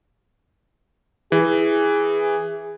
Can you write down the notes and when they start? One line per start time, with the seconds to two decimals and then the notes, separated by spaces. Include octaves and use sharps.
1.32 E3 G#4